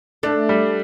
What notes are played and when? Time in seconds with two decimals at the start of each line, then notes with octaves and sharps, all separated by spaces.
0.23 A3 D4
0.49 G3